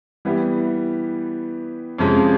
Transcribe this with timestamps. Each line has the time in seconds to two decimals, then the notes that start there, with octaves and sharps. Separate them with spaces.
0.25 E3 G3 B3 E4 G4
1.99 F2 C3 F3 G#3 C#4